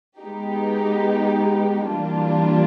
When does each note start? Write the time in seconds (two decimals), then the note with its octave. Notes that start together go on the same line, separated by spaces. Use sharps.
0.20 G#3 B3 D#4 G4
1.87 E3 G3 A#3 D4 F4